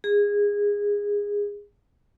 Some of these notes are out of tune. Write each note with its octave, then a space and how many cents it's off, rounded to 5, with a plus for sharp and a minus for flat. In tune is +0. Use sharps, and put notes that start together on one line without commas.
G#4 -20